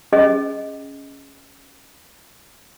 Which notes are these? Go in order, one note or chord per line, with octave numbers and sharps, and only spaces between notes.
C#4 G#4 D#5